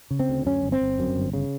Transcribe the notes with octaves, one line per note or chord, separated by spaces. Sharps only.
C#3
C4
D2
F#2 C#4
G1
C4
G1
F#2
G1
C#3